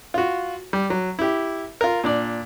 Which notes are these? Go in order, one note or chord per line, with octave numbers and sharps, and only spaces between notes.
F4 F#4
G3
F#3
E4 G4
F4 A#4
A#2 D4 D5